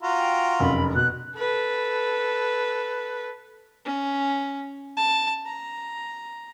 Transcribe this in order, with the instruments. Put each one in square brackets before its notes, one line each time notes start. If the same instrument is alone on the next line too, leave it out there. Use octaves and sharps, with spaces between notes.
[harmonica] F4 F#4 A#5
[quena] G5
[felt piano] F1 F#2 [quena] B5
[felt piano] B2 [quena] F#6
[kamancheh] A4 B4
[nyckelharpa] C#4
A5
A#5